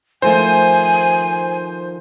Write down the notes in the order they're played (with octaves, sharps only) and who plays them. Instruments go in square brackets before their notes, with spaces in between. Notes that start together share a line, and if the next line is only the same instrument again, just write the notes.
[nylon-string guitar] D#3 F3 A3 [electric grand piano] C5 [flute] G#5